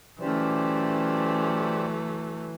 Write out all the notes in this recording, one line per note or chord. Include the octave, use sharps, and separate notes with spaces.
E3 F#3 A3 C#4 G4 C5 D5